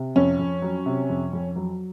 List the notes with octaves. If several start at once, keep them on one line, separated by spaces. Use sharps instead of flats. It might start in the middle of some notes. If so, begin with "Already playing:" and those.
Already playing: C3
F2 C#4
F2
F#3
C3
F2
F2
F#3